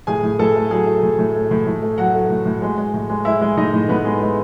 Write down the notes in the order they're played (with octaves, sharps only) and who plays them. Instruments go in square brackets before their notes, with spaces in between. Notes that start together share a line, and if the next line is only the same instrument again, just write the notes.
[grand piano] A2 G#4 G#5
A2
A2 A4 A5
A3
F#3 G#4 G#5
A3
A2
A2
A3
A2
A2
A3
F#3 F#4 F#5
A3
A2
A2
G#3
G#3
A2
G#3
G#3 E4 E5
G#3
A2 D#4 D#5
A2
A2 B3 B4
G#3
G#3